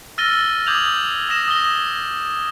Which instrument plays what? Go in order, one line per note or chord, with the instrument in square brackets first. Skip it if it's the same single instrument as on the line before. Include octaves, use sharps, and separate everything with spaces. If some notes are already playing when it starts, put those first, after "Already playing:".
[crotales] E6 F6 A6 A#6 D#7 G7
D6 D#6 G6 G#6 F7 F#7
D#6 A#6 E7
D#6 A#6 G7